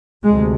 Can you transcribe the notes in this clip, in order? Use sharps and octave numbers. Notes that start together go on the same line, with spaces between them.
D2 C3 G#3